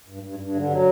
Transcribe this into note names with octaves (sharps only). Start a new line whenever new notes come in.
G2
G2
G2
D3
F#3